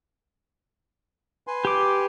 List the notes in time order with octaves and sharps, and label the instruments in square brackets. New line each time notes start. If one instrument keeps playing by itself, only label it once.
[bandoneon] B4 G#5 C6
[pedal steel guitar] G4 D6